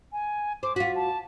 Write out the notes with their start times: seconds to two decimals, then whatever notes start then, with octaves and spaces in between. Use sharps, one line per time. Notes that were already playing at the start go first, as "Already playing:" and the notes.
0.12 G#5
0.63 C5 D6
0.76 F4 F#4 B6
0.96 A5